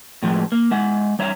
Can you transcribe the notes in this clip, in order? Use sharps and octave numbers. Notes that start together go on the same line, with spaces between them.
A2 F3 F#3 G#3
A#3
G#3 E5 F#5
G3 C#5 E5 A#5